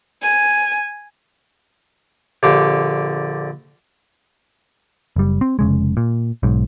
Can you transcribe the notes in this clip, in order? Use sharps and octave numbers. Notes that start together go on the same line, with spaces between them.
G#5
A#1 D3 G4
F#1 G3
C4
F1 C#3 G#3
A#2
B1 G#2